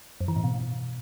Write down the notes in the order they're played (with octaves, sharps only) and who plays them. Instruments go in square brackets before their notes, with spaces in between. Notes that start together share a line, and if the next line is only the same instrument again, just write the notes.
[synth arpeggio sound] F#2
E3
A2
B2